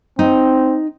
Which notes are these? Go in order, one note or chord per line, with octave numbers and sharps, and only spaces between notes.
C4 D#4